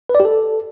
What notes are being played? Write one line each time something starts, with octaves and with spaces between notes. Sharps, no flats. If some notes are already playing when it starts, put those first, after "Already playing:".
B4
D5
G4
A4